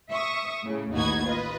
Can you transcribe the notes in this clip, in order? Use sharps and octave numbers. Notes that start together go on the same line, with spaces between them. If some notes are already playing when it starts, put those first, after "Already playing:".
E5 C#6 D#6
A2 C#3
A1 D#2 D#4 F#4 B4 G#6
F4 B4 D#5